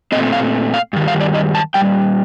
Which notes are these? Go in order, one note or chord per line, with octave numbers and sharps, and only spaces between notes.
A#2 A3 C4 D#5
F5
F5
G2 D#3 G3
F5
D5
D#5
A5
A#2 G3 G5